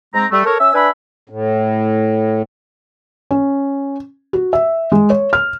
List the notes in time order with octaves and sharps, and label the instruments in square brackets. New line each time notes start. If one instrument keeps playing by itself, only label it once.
[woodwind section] G#2 G#3 C4 A#5
G3 A3
A4 A#4 C#5
C#4 E5 E6
D4 B4 E5 G#5 B5
[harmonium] A2
[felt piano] C#4
F#4
E5
G#3
C#5
F6